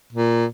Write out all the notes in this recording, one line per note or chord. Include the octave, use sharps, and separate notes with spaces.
A#2